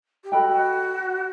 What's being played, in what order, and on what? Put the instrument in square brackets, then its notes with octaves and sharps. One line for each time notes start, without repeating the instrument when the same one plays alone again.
[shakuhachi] G4
[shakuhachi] F#4 [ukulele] A4 D#5 G5 B5